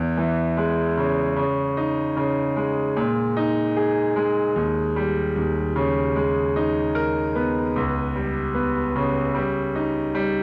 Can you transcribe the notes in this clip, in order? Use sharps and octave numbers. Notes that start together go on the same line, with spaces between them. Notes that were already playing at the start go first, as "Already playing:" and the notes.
Already playing: E2
E3
G#3
C#3
C#3
D#4
C#3
G#3
A#2
D#4
G#4
G#3
D#2
G3
D#2
C#3
G#3
D#4
A#4
B3
C#2
G3
B3
C#3
G3
D#4
G3